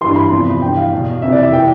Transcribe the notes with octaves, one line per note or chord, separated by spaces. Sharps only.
G2 E3 C6
B5
E2 C3 F3
G2 E3 G5
F5
E2 B2
F2 C3 E3 E5
D5
E5
E3 G5